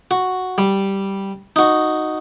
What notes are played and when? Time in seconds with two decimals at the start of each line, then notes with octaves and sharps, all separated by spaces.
0.11 F#4
0.58 G3
1.56 D#4 F#4